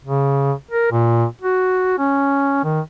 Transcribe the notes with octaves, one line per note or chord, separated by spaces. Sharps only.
C#3
A#4
A#2
F#4
C#4
D#3